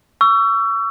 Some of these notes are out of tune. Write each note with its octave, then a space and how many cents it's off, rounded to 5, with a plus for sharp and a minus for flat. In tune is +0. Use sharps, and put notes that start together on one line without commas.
C#6 +30 E6 +30